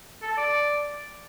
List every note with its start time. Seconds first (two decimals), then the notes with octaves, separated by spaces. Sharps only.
0.23 A4
0.30 A5
0.37 D5